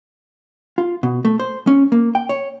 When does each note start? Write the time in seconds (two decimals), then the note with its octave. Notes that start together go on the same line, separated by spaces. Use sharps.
0.78 F4
1.03 B2
1.25 A3
1.40 C5
1.67 C#4
1.92 A#3
2.15 G5
2.29 C#5